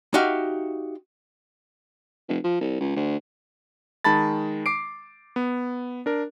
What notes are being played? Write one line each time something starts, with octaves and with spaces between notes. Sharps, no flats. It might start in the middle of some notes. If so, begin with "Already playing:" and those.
D#4 F#4 G4 E5 F5
F1
F3
C2
C#2
D2
D#3 G#3 A5 B5 A6
D6 C7 D7
B3
D4 A#4